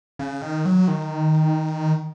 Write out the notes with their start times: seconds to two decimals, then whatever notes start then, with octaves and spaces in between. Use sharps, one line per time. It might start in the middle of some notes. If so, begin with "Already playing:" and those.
0.19 C#3
0.41 D#3
0.65 F#3
0.88 D#3